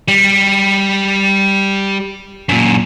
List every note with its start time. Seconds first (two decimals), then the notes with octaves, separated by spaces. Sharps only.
0.08 G3
2.49 F#2 A#2